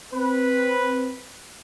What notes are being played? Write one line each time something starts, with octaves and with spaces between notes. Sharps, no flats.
C4 B4